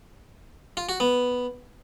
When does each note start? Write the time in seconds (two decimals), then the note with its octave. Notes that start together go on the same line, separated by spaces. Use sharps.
0.77 F4
0.89 F#4
1.00 B3